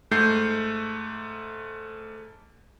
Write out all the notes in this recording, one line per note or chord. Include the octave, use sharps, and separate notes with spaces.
G#2 A3 G6 C7